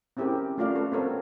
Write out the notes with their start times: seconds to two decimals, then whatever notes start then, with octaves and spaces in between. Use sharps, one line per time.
0.17 C4 C#4 E4 G4 G#4 A#4
0.58 A3 C#4 F4 F#4 D5 F5
0.76 A4 B4
0.92 B3 C4 F#4 A4 A#4 C#5